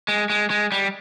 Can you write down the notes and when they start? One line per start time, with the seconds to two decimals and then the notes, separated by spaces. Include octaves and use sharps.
0.08 G#3
0.30 G#3
0.50 G#3
0.72 G3